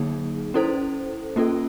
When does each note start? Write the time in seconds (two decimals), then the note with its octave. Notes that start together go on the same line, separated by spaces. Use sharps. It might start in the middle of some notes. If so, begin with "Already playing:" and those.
Already playing: D3 F#3 A#3 D#4 G#4
0.54 C#4 E4 A4 C5
1.36 A#3 C#4 F4 A4